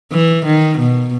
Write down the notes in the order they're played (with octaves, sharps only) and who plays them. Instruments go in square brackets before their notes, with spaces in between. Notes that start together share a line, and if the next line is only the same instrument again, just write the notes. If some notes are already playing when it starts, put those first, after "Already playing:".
[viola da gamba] E3
D#3
B2